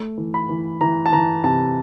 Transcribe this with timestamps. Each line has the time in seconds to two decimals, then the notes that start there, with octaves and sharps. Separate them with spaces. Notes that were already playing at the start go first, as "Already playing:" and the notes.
Already playing: A3
0.18 E3
0.34 B5
0.49 E3
0.81 E3 A#5
1.06 A5
1.13 E3 A#5
1.44 C3 A5